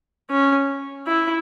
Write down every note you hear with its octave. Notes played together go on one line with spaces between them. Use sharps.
C#4
E4